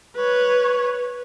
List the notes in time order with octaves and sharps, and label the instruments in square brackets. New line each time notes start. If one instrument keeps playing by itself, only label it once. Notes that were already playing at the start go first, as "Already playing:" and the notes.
[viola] B4 C#5